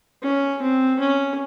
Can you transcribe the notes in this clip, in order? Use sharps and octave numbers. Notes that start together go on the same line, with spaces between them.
C#4
C4
C#4